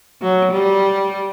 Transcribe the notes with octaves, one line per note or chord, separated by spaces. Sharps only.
F#3
G3